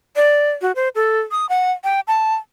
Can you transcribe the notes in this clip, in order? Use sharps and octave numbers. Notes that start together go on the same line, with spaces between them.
D5
F#4
C5
A4
D#6
F#5
G5
A5